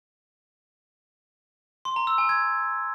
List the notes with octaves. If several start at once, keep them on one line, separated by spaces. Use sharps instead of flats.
C6
A#5
E6
G#5
G#6